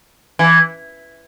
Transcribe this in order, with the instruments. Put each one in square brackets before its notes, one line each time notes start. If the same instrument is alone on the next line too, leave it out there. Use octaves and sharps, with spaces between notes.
[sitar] E3